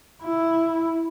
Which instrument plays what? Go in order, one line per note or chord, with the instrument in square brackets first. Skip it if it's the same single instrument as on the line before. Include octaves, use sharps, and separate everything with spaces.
[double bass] E4